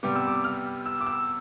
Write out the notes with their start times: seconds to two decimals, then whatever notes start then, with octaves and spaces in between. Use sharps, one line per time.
0.03 C3 G3 B3 D6
0.16 E6
0.27 D6
0.44 F6
0.86 E6
1.01 D6
1.07 E6